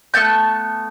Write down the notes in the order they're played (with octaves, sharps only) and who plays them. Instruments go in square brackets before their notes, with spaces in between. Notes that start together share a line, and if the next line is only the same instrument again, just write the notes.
[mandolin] A3 B3 A5 G6